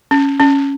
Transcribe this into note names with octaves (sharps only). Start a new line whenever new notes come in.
C#4
C#4